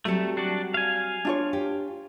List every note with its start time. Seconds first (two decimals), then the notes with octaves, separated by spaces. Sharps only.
0.05 F#3 G3 A3 C4 A4
0.37 D4 F#4 D5
0.74 F5 G#5
1.25 D4 F4 C#5
1.53 G4